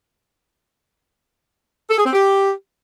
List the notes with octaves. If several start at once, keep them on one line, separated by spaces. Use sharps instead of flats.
A4
G#4
C4
G4